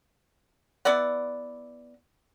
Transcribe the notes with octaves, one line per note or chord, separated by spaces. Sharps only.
B3 E4 D5 F#5